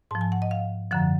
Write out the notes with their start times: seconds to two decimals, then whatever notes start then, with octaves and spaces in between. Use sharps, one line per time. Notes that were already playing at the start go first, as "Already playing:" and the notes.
0.11 G#2 F3 A5
0.21 G#5
0.32 F#5
0.42 D#5
0.51 F5
0.91 F#2 D3 F3 F#5